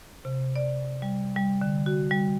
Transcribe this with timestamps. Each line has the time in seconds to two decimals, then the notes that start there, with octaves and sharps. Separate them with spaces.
0.25 C3
0.56 D5
1.02 G3
1.36 G3
1.61 D3
1.86 F#4
2.11 G3